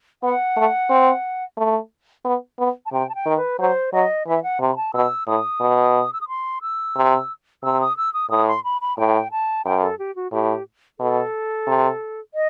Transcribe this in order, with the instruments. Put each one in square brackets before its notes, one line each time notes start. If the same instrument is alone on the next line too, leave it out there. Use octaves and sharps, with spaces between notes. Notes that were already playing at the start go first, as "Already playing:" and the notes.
[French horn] B3 [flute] F#5
[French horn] A3
C4
A3
B3
B3
[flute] A5
[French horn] C3 [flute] G5
[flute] A5
G5
[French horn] D#3
[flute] B4
[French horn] F#3 [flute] C5
[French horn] F#3 [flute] D#5
[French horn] E3 [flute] E5
[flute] F#5
[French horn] C3
[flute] B5
A5
[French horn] B2 [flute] E6
[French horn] A2 [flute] D#6
[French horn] B2
[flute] E6
D#6
C6
E6
[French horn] C3
[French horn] C3 [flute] E6
[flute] D#6
E6
D#6
[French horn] A2 [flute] D#6
[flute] C6
B5
B5
[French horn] A2 [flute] G5
[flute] A5
[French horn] F#2 [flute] G5
[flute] A4
G4
F#4
[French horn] A2 [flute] G4
[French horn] B2 [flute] A4
[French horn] C3
[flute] D#5